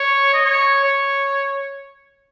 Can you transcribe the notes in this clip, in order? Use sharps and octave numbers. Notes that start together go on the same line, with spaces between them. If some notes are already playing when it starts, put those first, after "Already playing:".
Already playing: C#5
D#5
C#5
C#5